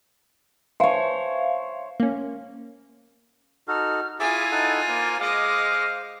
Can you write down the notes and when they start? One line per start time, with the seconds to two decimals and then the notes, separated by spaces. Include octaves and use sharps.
0.80 C5 C#5 E5 F5
2.00 A#3 C#4
3.68 D#4 F#4 A4 F6
4.20 E4 F4 G#4 E5 G#5 D6 A6
4.52 D#4 A4 F#5
4.89 A#3 C5
5.20 G#3 D#5 F5 D6